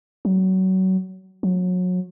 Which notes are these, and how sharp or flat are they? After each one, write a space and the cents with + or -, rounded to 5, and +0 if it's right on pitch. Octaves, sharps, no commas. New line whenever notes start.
F#3 +25
F#3 -30